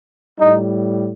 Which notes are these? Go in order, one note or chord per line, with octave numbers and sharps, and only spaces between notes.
A2 G3 D#4